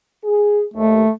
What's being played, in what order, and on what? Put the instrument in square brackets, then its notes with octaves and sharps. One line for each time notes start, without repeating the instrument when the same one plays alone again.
[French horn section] G#4
[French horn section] D#2 [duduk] A3